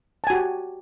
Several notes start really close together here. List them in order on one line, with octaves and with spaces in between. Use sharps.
A5 G#5 F#4 G4